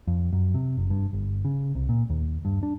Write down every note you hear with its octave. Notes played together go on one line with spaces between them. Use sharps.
F2
F#2
C3
F#1
G2
G1
C#3
C2
A#2
D#2
G2
D4